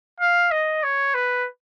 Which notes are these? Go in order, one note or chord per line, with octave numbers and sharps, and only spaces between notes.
F5
D#5
C#5
B4